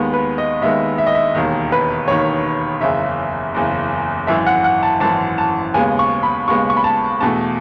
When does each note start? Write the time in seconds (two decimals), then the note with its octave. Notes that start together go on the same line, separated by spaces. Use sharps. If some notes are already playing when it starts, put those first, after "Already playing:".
Already playing: D#2 D#3 G#3 B3
0.13 B4
0.38 D#5
0.61 D#2 D#3 G#3 B3 E5
0.98 E5
1.06 D#5
1.15 E5
1.35 E1 D#2 D#3
1.72 B4
2.08 E1 D#2 D#3 C#5
2.81 F#1 E2 C#3 E5
3.55 F#1 E2 C#3
4.27 G#1 F#2 E3 E5
4.46 F#5
4.64 F#5
4.83 A5
5.00 G#1 F#2 E3 A5
5.38 A5
5.74 D#2 C#3 G#3 B3 G#5
5.99 C#6
6.23 B5
6.47 D#2 C#3 G#3 B3 C#6
6.70 C#6
6.77 B5
6.84 A5
7.21 E2 B2 A3 A5